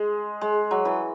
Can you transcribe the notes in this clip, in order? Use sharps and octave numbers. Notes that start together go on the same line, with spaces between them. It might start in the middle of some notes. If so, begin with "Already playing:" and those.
Already playing: G#3
G#3
F#3
E3